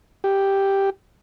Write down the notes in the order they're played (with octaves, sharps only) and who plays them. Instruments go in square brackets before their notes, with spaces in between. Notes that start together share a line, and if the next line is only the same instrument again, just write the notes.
[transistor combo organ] G4